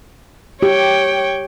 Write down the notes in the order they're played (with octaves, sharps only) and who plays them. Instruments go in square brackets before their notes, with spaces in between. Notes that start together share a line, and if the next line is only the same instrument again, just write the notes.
[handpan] G4 [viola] C#5 G5